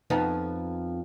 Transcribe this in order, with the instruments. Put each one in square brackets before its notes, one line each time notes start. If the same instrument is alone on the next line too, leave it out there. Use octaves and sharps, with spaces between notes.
[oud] F2 B3 D#4